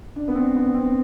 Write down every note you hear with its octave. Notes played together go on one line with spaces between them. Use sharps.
D4
B3
C4
B3
C4